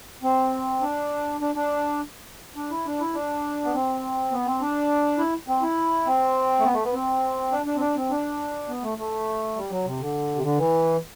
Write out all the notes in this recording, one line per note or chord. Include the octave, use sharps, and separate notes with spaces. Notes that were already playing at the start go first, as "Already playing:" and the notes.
C4
D4
D4
D4
D4
E4
D4
E4
D4
B3
C4
B3
C4
D4
E4
C4
E4
C4
A3
B3
A3
B3
C4
D4
D4
C4
D4
C4
D4
B3
A3
A3
G3
F#3
C3
D3
C3
D3
E3